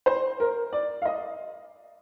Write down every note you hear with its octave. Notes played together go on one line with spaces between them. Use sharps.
C5
A#4
D5
F5
D#5